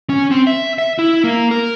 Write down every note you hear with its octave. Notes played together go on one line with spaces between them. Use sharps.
C#4
C4
E5
E5
E4
A#3
A#4